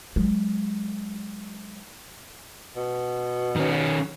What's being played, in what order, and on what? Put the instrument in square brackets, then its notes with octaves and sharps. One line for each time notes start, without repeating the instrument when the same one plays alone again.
[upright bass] F#3 G#3
[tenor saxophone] B2
[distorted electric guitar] D#3 C#4